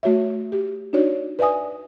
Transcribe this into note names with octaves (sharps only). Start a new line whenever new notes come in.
A3 F#4 C#5 E5
G4
D4 D#4 F#4 C#5 D5
B4 D5 E5 G#5 D#6